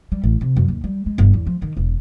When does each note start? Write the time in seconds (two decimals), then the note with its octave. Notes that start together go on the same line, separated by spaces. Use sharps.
0.12 G3
0.24 A1
0.41 C3
0.57 F#2
0.68 D#2
0.84 G3
1.06 G#3
1.18 G1
1.34 E2
1.47 F3
1.62 D#3
1.77 E1